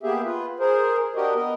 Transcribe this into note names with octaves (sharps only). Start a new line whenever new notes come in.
A#3 B3 G4 G#4 E5
F4 B4
G#4 A#4 C5
D4 F#4 G4 A#4 D#5
B3 A#4 D#5